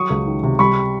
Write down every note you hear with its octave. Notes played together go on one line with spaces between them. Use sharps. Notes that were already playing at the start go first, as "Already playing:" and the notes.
Already playing: F#3 C#6 D#6
C#2
D#3
C3
G3 B5 C#6